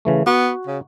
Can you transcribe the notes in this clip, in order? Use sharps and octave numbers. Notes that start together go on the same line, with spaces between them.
C#3 E3 A3
B3 F#4
C#3